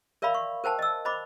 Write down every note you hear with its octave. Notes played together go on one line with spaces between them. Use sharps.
A#4 D5 E5 F5 B5 C6
C#6
A#4 C5 G5 A5
D#5 E6
C5 D#5 B5 D6